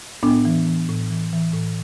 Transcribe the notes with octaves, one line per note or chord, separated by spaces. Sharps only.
A2 B3 D4
E3
E3
A2
E3
E3
A2